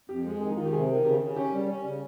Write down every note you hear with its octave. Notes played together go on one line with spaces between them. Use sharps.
F2 G4
G#3
D#3 G#4
D#4
D#3 F4
G4
C3 G#4
D#3
C#3 G4
C#3
C#4 G4
G3
C#4
C#3